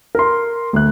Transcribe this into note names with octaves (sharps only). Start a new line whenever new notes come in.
A#4 C6
D2 F#6